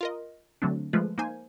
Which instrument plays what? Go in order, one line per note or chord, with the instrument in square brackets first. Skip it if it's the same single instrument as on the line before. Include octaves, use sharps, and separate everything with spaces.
[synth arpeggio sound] F4 A#4 D#5
D3 F#3 A3 C4 D4
F3 G#3 A3 F4 B4
A#3 D#4 C5 G#5